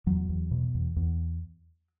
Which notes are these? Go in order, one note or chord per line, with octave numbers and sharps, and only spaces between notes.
E2 F#3
E2
B2
E2
E2